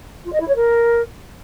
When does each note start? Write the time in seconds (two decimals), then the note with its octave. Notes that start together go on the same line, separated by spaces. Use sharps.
0.25 F4
0.32 D#5
0.40 E4
0.47 C#5
0.55 A#4